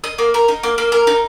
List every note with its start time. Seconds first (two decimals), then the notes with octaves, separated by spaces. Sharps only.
0.04 D#5
0.18 A#3
0.34 A#4
0.48 D#4
0.63 A#3
0.78 A#3
0.92 A#4
1.07 D#4